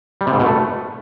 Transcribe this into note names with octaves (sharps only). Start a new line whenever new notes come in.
G3
C3
G#2
B2
A3